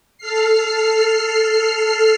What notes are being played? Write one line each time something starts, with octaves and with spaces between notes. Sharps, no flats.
A4 F6 C7